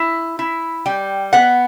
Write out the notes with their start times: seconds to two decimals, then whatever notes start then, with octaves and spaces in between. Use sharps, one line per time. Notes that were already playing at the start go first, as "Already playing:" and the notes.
Already playing: E4
0.39 E4
0.86 G3 G5
1.33 B3 F#5